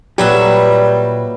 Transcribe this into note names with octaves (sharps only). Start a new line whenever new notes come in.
A#2 F#3 G3 G4 B4 E5